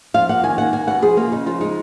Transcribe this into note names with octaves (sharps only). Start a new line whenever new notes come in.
F3 F5
A#3 F#5
D#3 G#5
A#3 F#5
A#3 G#5
B2 F#5
F3 G#4
A#3 F4
C#3 D#4
F3 F4
G#3 D#4